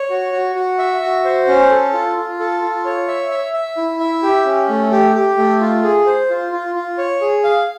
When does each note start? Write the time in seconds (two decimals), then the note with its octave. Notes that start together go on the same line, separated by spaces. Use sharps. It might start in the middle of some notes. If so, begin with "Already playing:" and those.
Already playing: C#5
0.10 F#4
0.33 F#4
0.55 F#4
0.79 E5
1.01 F#4
1.25 C5
1.48 C#4
1.70 A4
1.93 F4
2.16 F4
2.39 A4
2.62 F4
2.85 C#5
3.08 E5
3.31 E5
3.54 E5
3.77 E4
4.00 E5
4.23 G4
4.45 C#4
4.69 A3
4.91 G4
5.14 G4
5.37 A3
5.61 F4
5.83 G#4
6.07 C5
6.30 F4
6.52 F4
6.75 F4
6.98 C#5
7.21 G#4
7.44 F5